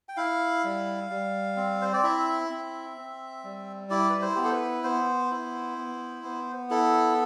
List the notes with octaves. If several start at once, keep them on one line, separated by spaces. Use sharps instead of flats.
G5
E4 F5
G3
G3
C4
C5
D5
E4 E5
C4
C4
G3
E4 D5
B4
C5
B3 G4
A4
B4
B3 C5
E4
B3
B3
E4 A4